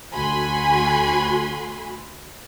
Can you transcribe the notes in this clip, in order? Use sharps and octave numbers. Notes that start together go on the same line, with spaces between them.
D2 A3 F#4 G#5 B5 C6